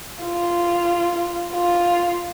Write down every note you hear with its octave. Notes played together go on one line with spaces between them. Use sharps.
F4
F4